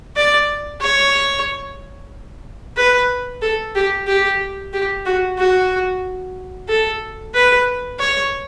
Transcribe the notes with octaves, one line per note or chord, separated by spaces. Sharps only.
D5
C#5
B4
A4
G4
G4
G4
F#4
F#4
A4
B4
C#5